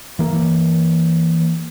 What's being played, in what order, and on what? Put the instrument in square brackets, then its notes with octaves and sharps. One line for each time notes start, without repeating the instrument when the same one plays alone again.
[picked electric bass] E3 A#3